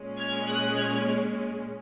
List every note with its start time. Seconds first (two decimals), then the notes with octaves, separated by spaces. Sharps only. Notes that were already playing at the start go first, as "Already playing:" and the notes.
Already playing: A#2 G#3 C#4
0.18 F6 G#6
0.47 D#6 F#6
0.76 F6 G#6